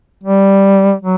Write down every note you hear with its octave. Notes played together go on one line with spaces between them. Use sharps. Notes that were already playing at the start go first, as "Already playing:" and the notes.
G3
F#3